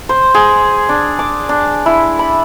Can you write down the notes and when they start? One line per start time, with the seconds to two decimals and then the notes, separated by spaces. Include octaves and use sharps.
0.09 C5
0.34 G#4
0.89 D4
1.19 D6
1.49 D4
1.86 E4
2.19 B5